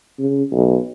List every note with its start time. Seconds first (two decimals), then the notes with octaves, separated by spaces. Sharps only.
0.19 C#3
0.52 B1